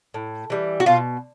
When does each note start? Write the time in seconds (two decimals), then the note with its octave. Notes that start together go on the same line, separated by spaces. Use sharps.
0.14 A2
0.50 E3 G3
0.80 F#4
0.86 B2 F4